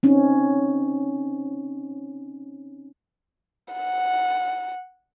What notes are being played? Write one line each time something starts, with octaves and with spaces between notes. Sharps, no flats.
C4 C#4 D#4
F#5